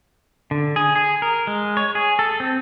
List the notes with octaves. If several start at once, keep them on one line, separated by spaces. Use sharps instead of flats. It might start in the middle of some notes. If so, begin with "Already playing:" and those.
D3
G#4
G#4
A#4
G#3
C#5
G#4
A4
C4